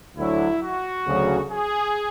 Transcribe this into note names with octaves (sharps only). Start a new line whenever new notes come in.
D2 D3 F#3 E4
F#4
D2 C#3 F#3
G#4